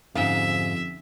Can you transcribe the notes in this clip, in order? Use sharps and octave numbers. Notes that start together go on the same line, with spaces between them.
F2 G#2 D3 C#4 D#4 E5 F5